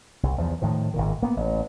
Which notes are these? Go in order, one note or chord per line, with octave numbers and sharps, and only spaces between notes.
C2
E2 F3
A2 D#3 F3
G#1 A#2 D#3
A#3 B3
A1